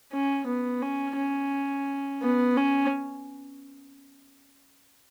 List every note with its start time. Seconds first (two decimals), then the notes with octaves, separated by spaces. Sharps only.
0.12 C#4
0.47 B3
0.82 C#4
1.17 C#4
2.22 B3
2.56 C#4